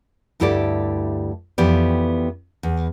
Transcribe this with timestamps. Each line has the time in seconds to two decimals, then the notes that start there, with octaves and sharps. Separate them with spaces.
0.40 D2 G2 E4 G4 A4 D5
1.58 F2 E3 B3 G4 D5
2.63 E2